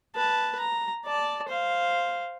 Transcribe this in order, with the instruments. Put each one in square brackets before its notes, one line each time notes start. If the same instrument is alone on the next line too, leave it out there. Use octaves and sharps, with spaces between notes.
[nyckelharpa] B4 A5
A#5
D5 A5
C5 F5